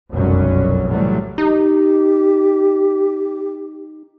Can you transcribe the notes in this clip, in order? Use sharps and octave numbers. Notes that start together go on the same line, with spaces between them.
F1 B1 F#2 F#3 G3 C#4
A2 C3 E3 F#3 G3 A3
D#4 G4